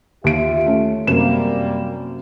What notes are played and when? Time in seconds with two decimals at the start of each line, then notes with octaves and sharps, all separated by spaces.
0.24 D#2 F4 G4 E5 D7
0.66 A3 C#4
1.07 F#2 C3 G3 A#3 E7